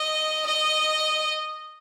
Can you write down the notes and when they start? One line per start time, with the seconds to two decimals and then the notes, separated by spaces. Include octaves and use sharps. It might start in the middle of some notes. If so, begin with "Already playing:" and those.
Already playing: D#5
0.46 D#5